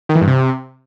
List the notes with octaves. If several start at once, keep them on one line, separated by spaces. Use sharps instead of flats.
D#3
E3
G2
C3